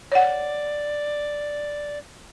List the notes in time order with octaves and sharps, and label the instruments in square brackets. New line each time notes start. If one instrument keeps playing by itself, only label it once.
[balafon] C#5 F#5 [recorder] D5